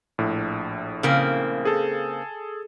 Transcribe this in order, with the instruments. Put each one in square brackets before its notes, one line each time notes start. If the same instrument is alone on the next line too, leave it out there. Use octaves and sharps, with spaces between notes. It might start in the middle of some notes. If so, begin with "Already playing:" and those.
[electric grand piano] A#1 A2
[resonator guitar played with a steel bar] C#3 A#3 C4
[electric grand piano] G#4 A4